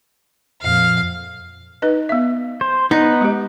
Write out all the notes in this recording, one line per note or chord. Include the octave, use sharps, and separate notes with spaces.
F2 A#2 F5
D#4 B4 D#5
B3 E5
C5
B3 D#4 B4
G#3 G4